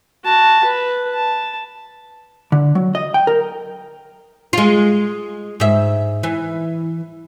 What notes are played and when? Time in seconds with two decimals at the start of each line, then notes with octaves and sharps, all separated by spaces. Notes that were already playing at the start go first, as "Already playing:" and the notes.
0.25 F#4 A5
0.64 B4
1.13 A5
2.52 D3
2.75 F#3
2.95 D#5
3.14 G5
3.27 A#4
4.53 G#3 F4
5.60 G#2 E5
6.23 E3